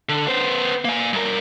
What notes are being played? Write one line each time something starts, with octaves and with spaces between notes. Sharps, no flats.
D3
B3 C5
A#3 G#5
G2 A#4